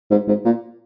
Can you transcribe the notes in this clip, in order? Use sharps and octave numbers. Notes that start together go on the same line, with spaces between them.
G#2
G#2
A#2